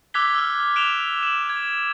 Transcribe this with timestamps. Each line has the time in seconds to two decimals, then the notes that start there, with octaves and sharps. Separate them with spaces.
0.14 D6 E6 F#6 G#6 B6 G7
0.34 E6 F6
0.76 F#6 D7 E7 F7 G7
1.23 E7 F#7
1.49 G#6